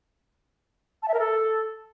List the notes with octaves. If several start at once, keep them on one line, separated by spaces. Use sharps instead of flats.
A5
E5
A#4
A4